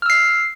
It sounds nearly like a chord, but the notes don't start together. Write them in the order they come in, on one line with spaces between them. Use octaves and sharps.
F6 E6 C7